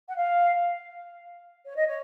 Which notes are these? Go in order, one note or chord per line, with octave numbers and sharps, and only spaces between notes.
F#5
F5
C#5
D#5
C#5